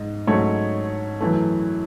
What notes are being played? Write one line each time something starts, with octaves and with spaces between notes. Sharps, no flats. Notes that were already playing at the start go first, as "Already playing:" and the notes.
Already playing: G#2 D#5
G#2 F#3 A3 C#5
F#2 E3 A3